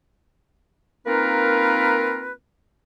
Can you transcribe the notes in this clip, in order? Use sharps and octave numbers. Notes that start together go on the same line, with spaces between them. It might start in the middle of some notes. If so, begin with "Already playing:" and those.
A#3 C4 D#4 F4 A#4 B4